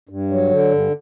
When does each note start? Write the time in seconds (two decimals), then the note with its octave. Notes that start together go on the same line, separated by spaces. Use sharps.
0.09 G2
0.30 F#3
0.51 D3
0.71 G2